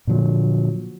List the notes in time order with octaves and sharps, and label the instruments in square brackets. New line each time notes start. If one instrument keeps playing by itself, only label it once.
[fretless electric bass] A#2 D3 F3 F#3